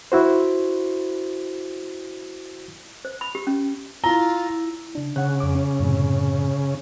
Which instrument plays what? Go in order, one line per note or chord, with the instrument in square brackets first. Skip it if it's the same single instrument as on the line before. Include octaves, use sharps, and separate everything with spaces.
[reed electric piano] E4 F#4 C5
[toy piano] C5
B5
G4
C#4
[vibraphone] E4 [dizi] F4 [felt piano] A#5
[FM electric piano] C#3 D4
[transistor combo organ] C#3 [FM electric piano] F#5 F#6
[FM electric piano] F2 D6
C#4
F#2 A2 C3